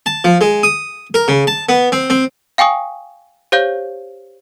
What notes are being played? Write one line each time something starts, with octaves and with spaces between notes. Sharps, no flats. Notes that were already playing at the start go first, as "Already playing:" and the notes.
A5
F3
G#3
D#6
A#4
C#3
A5
B3
C4
C4
F5 G5 G#5 C#6 D#6
G4 C5 C#5 F5 G6